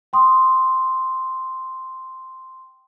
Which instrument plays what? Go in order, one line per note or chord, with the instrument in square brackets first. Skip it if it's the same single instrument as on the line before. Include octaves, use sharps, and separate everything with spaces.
[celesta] G5 C6 D#6